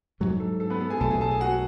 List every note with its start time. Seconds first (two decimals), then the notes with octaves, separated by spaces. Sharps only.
0.20 G#2 F#3 A3
0.40 A4
0.60 A4
0.70 B3 B4
0.81 A4
0.90 G#4 G#5
1.00 B1 B2 A3 A4 A5
1.11 G#4 G#5
1.21 A4 A5
1.31 G#4 G#5
1.41 F#4 F#5